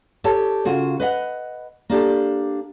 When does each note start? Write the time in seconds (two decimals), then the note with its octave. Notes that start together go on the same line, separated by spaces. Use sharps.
0.24 G4 A4 C#5 A5
0.65 C#3 F4 F#4 G#4
1.00 B4 D#5 F#5
1.89 A#3 D4 G4 A4